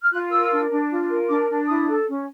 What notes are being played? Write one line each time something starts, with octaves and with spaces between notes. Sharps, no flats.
F6
F4 F#6
A#4 E6
D4
D4
F4
A#4
D4 D6
D4
E4 D#6
A4
C#4